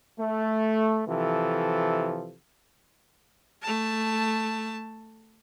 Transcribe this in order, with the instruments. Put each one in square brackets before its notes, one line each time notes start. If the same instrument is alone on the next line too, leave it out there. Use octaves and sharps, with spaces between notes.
[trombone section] A3
C3 E3 F3 A4
[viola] A3 A5